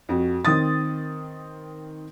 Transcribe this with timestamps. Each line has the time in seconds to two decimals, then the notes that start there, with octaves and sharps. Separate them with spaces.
0.09 F2 F#4
0.45 D#3 C4 D#6 A6